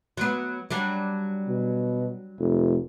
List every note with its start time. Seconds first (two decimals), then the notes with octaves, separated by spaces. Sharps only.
0.17 F#3 B3
0.71 F#3 G3 D4
1.48 B2
2.39 F1